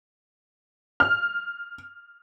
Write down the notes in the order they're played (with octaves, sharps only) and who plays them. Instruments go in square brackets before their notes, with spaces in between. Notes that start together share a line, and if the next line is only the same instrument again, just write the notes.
[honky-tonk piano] F6